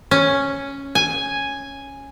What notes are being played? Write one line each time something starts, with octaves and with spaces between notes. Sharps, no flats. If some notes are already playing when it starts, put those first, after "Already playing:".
C#4
G#5